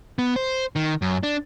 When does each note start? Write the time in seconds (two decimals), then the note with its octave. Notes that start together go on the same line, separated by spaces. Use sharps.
0.19 B3
0.36 C5
0.76 D#3
1.02 F#2
1.23 D4